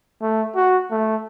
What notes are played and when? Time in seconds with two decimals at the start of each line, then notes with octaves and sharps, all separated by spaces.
0.22 A3
0.56 F#4
0.91 A3